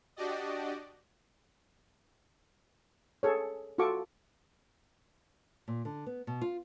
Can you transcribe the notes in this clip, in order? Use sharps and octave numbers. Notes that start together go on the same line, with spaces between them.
D4 F#4 G4 D5 D#5
G#4 A4 C#5
F4 F#4 A4 C#6 D6
A#2
D3
B3
B2
F4